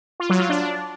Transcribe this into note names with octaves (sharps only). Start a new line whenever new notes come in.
F4
F#3
F4
D4